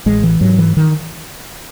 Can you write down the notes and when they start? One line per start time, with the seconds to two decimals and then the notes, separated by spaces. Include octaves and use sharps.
0.06 A1 G#3
0.23 E3
0.41 G#2 F#3
0.58 E3
0.77 D#3